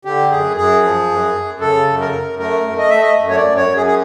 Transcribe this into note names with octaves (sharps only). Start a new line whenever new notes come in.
D3 G4
F#2 G#4
F#2 G#4
F3
F#2
F#2
C#3 A4
F#2
A#4
F#2
A3 A#4
A3
D#5
A3 E5
D#5
F#2
C#5
D5
F#2
C#5
F#2
G#4
G#4